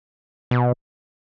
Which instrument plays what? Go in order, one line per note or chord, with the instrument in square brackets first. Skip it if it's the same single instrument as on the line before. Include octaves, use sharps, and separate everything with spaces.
[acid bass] B2